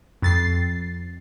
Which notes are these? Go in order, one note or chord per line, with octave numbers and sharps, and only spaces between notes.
F2 A6 C7